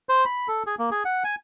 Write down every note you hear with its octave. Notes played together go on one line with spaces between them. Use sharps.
C5
B5
A4
G#4
A#3
G#4
F#5
G#5